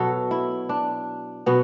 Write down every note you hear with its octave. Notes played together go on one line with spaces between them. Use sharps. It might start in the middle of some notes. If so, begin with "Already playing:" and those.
Already playing: B2 F#3 A4
E4
D4
B2 F#3 B3